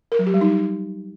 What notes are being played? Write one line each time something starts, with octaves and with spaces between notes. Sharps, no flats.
A#4
F#3
G4
G3
D#4